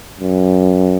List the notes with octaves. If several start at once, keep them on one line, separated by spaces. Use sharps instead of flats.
F#2